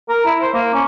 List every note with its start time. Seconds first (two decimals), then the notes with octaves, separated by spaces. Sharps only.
0.09 A#4
0.25 E4
0.41 C5
0.54 A#3
0.73 C#4